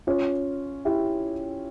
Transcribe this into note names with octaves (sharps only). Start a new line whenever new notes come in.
C#4 F4
E4 G4